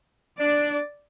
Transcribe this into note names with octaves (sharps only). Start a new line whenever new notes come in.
D4 D5